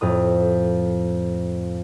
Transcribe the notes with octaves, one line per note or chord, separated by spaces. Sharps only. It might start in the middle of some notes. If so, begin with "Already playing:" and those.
F2 A2 D#6